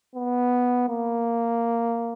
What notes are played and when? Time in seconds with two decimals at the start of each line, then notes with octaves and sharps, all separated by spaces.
0.15 B3
0.89 A#3